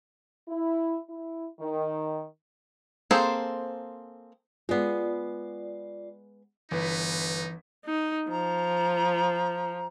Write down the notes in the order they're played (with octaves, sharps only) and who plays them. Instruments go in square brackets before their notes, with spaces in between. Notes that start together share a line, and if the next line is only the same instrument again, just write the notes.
[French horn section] E4
E4
D#3
[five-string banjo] A#3 C4 G#4 A4 C5
[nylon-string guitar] G#3 B3 [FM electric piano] F4 D5
[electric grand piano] G1 B4 B6 [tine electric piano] E3 [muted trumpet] D#4
[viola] D#4
[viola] F3 [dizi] A#5